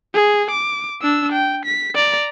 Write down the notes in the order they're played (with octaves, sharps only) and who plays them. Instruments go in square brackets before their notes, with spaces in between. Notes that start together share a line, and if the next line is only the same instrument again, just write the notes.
[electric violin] G#4
D6
D4 E6
G5
B6
D5 A#5